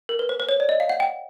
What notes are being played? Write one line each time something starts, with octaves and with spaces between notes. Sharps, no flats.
A#4
B4
C5
C5
C#5
D5
D#5
F5
F#5
G5